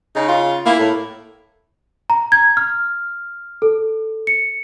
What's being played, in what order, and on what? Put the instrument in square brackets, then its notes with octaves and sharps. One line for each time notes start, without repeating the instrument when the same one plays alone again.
[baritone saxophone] C#3 [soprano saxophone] D#4
[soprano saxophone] F4
[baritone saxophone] A#3 [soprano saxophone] E4
[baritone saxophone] A2
[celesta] A#5
G#6
F6
A4
C#7